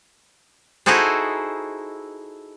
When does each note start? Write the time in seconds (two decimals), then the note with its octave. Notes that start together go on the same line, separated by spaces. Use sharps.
0.86 D#4 E4 F#4 G#4 A4 C5